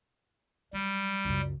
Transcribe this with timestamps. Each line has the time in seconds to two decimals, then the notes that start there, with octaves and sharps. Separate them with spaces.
0.73 F#3 G3
1.25 C#2 F#2